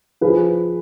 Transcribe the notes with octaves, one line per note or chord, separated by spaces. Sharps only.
F3 G#4 B4